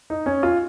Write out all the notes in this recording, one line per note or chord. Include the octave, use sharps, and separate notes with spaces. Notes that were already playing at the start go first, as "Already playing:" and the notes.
D#4
C#4
F4